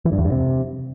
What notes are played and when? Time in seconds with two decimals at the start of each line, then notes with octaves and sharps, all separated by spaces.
0.05 E3
0.12 G2
0.18 E2
0.25 G2
0.32 C3